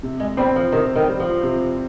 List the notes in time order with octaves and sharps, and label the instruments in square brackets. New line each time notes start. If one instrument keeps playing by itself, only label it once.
[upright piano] C3
[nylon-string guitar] G#3
[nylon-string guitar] G3 [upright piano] C4
[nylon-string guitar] F3
[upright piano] C3 [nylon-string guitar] D#3
[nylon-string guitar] D#3
[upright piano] G3
[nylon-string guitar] F3
[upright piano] C3